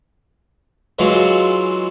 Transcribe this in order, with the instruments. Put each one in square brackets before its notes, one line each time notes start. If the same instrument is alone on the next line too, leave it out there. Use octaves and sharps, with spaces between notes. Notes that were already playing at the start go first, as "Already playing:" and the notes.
[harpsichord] E3 F#3 G#3 F4